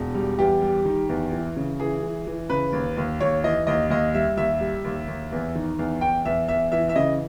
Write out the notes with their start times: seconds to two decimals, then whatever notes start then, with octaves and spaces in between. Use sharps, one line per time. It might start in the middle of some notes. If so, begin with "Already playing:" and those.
Already playing: E1
0.15 G3
0.39 E2 G4
0.62 G3
0.85 D#3
1.09 E2
1.32 E3
1.56 C#3
1.80 E3 G#4
2.02 E3
2.27 E3
2.50 C#3 B4
2.73 D#2
2.97 D#2
3.20 D#2 C#5
3.44 E3 D#5
3.67 D#2 D#5
3.90 D#2 D#5
4.14 G3 E5
4.37 D#2 E5
4.60 G3
4.85 D#2
5.08 D#2
5.32 E2
5.55 D#3
5.79 E2
6.01 E2 G5
6.25 E2 E5
6.48 E2 E5
6.72 E3 E5
6.89 E5
6.95 C#3 D#5